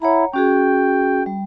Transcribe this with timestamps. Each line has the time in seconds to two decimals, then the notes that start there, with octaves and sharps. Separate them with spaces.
0.02 E4 C#5 F#5 A#5
0.33 C#4 F#4 G#4 G5
1.26 G3